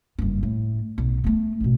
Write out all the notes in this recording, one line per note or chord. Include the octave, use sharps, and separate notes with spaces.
F#1 G2
A2
B1
A3 B3
A1 B2